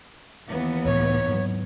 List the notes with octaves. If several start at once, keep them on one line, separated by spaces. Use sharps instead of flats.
D#2 E3 B3
C#2 A2 C#5
G#2 F#3